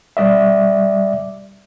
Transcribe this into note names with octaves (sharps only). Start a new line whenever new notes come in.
G3 D5 E5